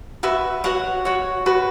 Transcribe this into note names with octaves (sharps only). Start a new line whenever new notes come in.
F#4 B4 E5
F#4 C#5 F#5
F#4 C#5
F#4 B4